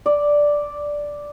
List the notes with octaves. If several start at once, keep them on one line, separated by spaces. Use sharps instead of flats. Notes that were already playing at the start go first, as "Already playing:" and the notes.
D5